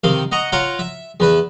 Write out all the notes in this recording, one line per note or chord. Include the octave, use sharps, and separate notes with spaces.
C3 D#3 F5
D#5 F#5 A#5 C#6
F4 C#5 F5 F#5 A#5
E5
E2 B4 E5